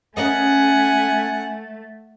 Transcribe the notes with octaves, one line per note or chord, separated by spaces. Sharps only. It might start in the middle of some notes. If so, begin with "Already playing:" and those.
A3 C#4 A#4 D#5 F#5 G#5